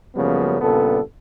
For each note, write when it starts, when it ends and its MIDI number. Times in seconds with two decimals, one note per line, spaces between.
0.16 0.59 42
0.16 0.59 49
0.16 0.59 53
0.16 0.59 55
0.16 0.59 58
0.16 0.59 59
0.61 0.99 43
0.61 0.99 46
0.61 0.99 49
0.61 0.99 59
0.61 0.99 69